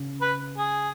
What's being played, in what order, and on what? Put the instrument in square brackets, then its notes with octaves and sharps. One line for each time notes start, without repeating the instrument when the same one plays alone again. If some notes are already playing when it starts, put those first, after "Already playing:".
Already playing: [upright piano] C#3
[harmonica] B4
G#4